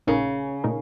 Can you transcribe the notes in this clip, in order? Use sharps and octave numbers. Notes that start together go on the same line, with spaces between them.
A#1 A#2 C#3 A3 D#4 A#4
A#2 A3 D#4 A#4